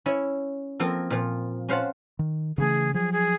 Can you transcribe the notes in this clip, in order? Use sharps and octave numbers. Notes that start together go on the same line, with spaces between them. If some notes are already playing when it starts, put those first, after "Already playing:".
C#4 E4 C#5
F3 A#3 C4 A4 A#4
A#2 F3
C#4 C5 F5 F#5 A5
D#3
C#3 E3 A3 G#4
F3 F#3 G#4
G#4